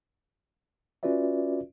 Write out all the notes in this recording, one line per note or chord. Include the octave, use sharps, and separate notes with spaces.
C#4 F4 F#4 B4 D5 E5